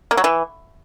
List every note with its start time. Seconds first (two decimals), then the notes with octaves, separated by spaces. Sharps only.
0.11 A#3
0.17 F#3
0.24 E3